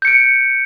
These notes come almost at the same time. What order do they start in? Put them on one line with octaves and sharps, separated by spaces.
G6 C#7 D7